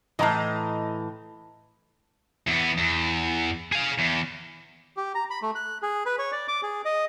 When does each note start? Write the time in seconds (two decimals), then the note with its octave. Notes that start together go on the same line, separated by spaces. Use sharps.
0.19 A2 E3 D#5 A5 A#5
2.49 E2 B3
2.79 E2
3.72 G#4 F5
3.98 E2
4.97 G4
5.15 A#5
5.30 B5
5.42 A3
5.55 F#6
5.83 G#4
6.06 B4
6.19 C#5
6.32 D5
6.48 D6
6.63 G#4
6.85 D#5